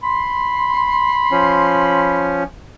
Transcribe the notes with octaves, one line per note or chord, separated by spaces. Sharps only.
B5 C6
F3 C#4